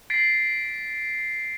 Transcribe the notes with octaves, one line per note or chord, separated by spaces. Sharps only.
A6 B6 C7 D7